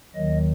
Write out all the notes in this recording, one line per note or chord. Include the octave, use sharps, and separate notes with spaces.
D#2 D#3 F#3 D#5